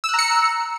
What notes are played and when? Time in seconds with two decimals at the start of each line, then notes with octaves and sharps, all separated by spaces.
0.04 E6
0.09 F#6
0.14 A#5
0.19 C#7